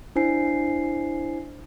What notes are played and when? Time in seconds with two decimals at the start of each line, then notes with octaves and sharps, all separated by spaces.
0.16 D4 E4 C5 G#5 C7